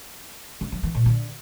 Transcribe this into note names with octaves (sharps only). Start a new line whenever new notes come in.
C#3
F3
E3
A#2
D3